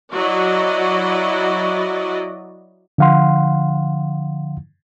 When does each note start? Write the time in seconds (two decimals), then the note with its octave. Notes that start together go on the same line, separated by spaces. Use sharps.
0.13 F#3 E4 F#4 D5 D#5
2.98 D3 F3 F5 F#5 C6